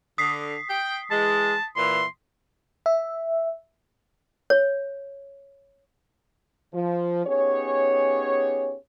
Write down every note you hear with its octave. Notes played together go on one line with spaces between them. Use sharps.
D3 D#6 B6 C7
G5
E3 G#3 A5
A#2 E3 C6
E5
C#5
F3
B3 C#4 D#4 G4 G#4 C#5